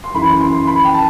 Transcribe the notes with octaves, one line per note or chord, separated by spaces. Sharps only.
C6
F#2 E3 B5
C6
B5
G5
A5